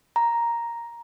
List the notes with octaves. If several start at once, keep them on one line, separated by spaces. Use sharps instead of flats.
A#5